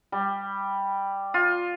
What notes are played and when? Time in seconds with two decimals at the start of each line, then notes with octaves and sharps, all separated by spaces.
0.12 G3
1.34 F4